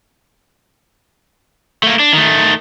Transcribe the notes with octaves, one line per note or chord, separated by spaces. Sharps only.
A3 A#3
D4
D#3 A3